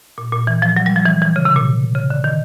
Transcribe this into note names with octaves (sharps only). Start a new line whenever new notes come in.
A#2
A#2
E3
F3
F#3
G3
F3
E3
E3
C#3
C3
A#2
C#3
D3
D#3